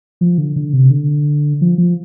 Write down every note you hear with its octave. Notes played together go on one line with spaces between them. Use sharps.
F3
D3
D3
C3
D3
F3
F3